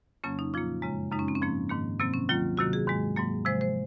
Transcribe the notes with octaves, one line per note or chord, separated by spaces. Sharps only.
F2 C#3 F#3 A#3 C#4
D#4
A#2 F3 A#3 F4
F#2 C#3 G#3
F#2 C#3 G#3 D#4
C#4
C4
C#4
G#2 F3 A#3
G#2 D#3 A#3
C3 F#3 A#3 C4
C#4
D#2 D#3 F#3 A#3 F4
C3 D#3 F#3 A#3 F#4
G#4
G#2 D#3 G#3
G#2 F#3 A#3
C3 F3 G#3 C5
C5